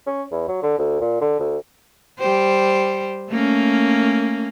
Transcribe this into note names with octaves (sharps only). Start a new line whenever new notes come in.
C#4
E2
F#3
D3
D2
A#2
D3
D2
G3 G4 C5
A3 A#3 C#4